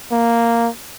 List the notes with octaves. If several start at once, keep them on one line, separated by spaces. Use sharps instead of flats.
A#3